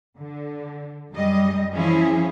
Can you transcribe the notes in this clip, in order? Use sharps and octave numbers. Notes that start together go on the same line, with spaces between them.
D3
F#2 G3 G#3 D#5
E3 F3 C#4 E4 G#4